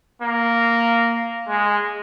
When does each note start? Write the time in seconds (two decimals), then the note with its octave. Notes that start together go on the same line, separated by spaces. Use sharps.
0.22 A#3
1.48 G#3